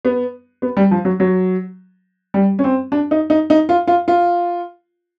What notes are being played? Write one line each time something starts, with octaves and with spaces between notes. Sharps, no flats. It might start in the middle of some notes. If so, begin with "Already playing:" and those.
B3
B3
G3
F3
F#3
F#3
G3
C#4
C4
D4
D#4
D#4
D#4
F4
F4
F4